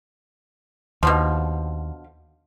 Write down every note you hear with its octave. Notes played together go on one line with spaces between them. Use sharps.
D#2 B2 D3 F3